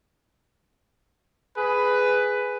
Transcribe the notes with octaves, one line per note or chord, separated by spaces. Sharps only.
G#4 B4